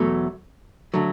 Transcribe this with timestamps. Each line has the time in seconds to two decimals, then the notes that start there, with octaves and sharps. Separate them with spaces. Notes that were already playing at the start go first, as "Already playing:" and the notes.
Already playing: E2 B2 F#3 A3
0.94 D3 F#3 A3